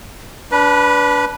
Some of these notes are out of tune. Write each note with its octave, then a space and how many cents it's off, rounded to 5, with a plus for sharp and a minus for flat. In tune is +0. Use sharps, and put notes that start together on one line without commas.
D4 -20 B4 +0 B5 -30